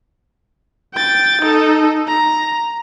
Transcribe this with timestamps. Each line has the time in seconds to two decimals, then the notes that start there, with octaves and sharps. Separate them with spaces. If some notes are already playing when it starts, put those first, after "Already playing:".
0.94 G5 A6
1.41 D#4 A4
2.07 A#5